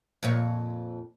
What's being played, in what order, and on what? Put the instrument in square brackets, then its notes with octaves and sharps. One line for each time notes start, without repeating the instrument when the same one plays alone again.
[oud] F2 A#2 C#5